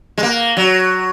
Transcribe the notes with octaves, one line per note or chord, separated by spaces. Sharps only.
G#3
A#3
F#3